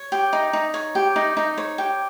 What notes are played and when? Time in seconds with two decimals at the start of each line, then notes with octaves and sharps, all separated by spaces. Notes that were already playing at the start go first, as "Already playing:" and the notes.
Already playing: C#5
0.12 G4
0.33 D#4
0.53 D#4
0.74 C#5
0.95 G4
1.16 D#4
1.37 D#4
1.58 C#5
1.78 G4